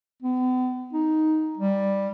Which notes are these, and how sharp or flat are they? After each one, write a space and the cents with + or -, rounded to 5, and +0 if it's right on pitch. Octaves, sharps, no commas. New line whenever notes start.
B3 +45
D#4 +5
G3 +5